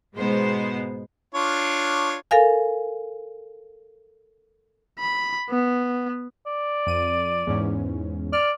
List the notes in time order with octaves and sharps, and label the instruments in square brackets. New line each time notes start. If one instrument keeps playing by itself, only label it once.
[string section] G#2 B2 G#3 B3 C5
[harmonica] D4 F4 C#5
[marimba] A4 A#4 F5 G#5
[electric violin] B5
B3
[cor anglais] D5
[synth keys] F2 D#7
E2 G#2 C#4
[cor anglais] D5 [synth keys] F6